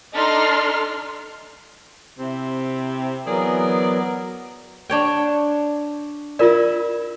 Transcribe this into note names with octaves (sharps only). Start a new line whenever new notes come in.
D4 D#4 A4 C6 F6 C7
C3 C4 E4
E3 F#3 B3 G#4 A#4 D5
D4 C#5 G5
E4 F4 A#4 D5 E5